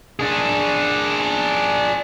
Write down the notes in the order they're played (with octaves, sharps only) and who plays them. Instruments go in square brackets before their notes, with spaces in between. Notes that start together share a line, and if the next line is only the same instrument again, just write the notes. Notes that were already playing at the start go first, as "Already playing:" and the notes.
[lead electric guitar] D4 G#4